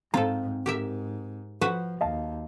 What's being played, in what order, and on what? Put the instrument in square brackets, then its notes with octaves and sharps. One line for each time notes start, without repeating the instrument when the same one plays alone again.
[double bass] G#2 [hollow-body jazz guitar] C4 A#5 [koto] F4 A4
[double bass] G#2 [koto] G4 A#4 E5
[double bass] F3 [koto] F#4 B4 C5
[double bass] D#2 [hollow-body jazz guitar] D#5 F5 A5